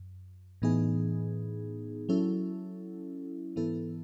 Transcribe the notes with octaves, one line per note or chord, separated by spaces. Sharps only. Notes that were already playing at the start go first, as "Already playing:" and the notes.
Already playing: F#2
A2 E3 B3 D#4 G#4
F#3 C#4 E4 A4
G#2 E3 B3 E4 A4